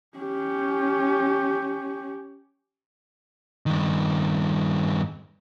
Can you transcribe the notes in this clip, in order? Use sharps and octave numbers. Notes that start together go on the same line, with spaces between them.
C#4 G4
G2 D#3